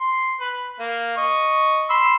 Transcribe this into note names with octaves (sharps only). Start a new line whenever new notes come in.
C6
B4
A#3
D#5 C#6
B5 C6 E6